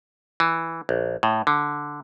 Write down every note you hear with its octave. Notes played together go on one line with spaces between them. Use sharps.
E3
A#1
A2
D3